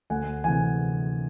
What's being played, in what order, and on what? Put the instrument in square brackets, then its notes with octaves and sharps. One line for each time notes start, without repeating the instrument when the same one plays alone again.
[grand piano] D2 F#5 G#5
C3 E3 F#5 G#5